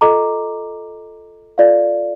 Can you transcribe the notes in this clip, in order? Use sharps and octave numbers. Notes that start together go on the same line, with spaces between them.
F4 A4 D#5 A#5 D6
F4 A4 D5 F5